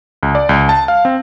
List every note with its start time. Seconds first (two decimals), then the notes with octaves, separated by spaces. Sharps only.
0.23 C#2
0.35 D5
0.49 C#2
0.69 A5
0.88 F5
1.05 C4